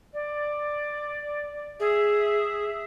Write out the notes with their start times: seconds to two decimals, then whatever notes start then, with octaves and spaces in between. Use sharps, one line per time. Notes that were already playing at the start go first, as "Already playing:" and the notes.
0.13 D5
1.80 G#4 E5